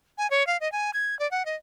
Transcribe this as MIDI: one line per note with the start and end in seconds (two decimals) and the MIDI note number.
0.18 0.30 80
0.31 0.46 73
0.47 0.57 77
0.61 0.70 75
0.72 0.91 80
0.94 1.18 92
1.19 1.29 74
1.31 1.45 78
1.46 1.56 75